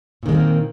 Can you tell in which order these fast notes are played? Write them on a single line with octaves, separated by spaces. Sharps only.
A#2 D#3 G#3 C4 A#3